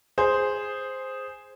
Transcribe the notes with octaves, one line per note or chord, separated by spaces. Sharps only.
G#4 C5